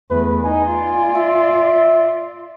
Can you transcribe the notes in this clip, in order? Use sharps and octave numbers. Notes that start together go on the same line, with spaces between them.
E2 A3 B4
D#4 G#5
F4 D5
E5